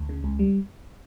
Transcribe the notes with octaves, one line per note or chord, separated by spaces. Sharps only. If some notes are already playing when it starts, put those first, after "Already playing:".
Already playing: D2
C#3
C#2
G3